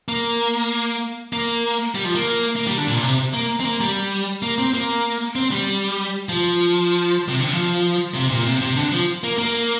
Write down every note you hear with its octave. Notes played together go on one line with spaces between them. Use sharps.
A#3
A#3
G3
F3
A#3
A#3
G3
D3
A#2
C3
C3
A#3
C4
A#3
G3
A#3
C4
A#3
C4
G3
F3
C3
D3
F3
C3
A#2
C3
C3
D3
F3
A#3
A#3